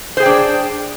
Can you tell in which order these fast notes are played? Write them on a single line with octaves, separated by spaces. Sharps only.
C5 G#4 G5 D4